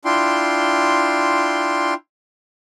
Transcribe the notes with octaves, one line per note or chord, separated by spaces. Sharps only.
D4 E4 F4 G5 C6